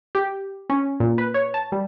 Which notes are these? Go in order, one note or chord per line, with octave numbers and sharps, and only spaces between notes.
G4
C#4
A#2
B4
C#5
A5
G3